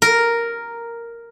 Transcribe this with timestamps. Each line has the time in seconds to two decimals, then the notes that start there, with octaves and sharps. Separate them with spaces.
0.02 A#4